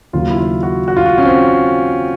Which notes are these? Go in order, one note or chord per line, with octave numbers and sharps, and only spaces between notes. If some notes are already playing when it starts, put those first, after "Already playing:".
D#2 C#3 F#3 F4
E4
F4
F#4
F#4
F4
F#4
C#4
C4